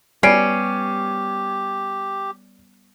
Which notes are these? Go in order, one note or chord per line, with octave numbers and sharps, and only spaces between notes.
G3 B3 C#4 G4 D5 C7 D7